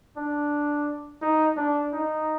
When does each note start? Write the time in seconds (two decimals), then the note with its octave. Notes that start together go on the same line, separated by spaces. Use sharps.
0.17 D4
1.22 D#4
1.56 D4
1.92 D#4